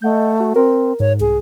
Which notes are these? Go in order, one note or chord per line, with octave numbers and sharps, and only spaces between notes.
A3 D#5 F#5 G6
F#4
C4 A#4
G#2 C#5
C2 G#4